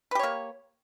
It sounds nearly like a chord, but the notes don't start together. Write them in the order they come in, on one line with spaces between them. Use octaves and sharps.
B4 G4 C#5 A#3